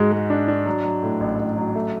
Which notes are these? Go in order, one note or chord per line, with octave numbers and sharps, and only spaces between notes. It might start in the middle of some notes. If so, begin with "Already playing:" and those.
Already playing: G#2 G#3 F#4
G#3
D4
D4
F#3
F#3
A2
A1
A1
F#3
A3